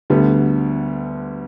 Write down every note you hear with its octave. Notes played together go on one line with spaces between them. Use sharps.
D2 D3 G3 B3